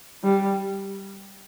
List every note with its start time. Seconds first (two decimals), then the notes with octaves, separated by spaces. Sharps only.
0.24 G3